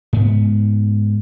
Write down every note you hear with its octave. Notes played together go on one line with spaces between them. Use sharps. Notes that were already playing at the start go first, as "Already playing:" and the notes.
G#2 B3